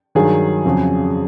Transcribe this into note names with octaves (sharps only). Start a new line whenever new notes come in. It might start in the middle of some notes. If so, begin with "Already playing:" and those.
G2 D#3 F#3 G#4
F2 C#3 F#3